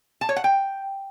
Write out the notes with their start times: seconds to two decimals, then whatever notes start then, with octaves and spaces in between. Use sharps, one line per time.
0.21 A5
0.29 C#5
0.36 F#5
0.44 G5